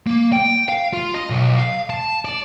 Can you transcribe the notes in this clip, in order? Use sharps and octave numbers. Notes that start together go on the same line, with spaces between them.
A#3
G5
F5
F4
D#5
B1
F5
A5
D5